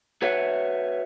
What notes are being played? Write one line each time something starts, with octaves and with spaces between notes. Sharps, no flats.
F#4 B4 C#5 E5 F#5